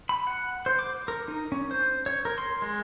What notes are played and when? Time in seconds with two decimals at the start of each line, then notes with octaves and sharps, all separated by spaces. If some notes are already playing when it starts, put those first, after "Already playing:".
0.09 B5
0.27 F#5
0.66 C5
0.79 D6
1.08 A#4
1.28 D#4
1.52 C#4
1.71 C5
2.06 C#5
2.25 A#4
2.38 C6
2.62 G#3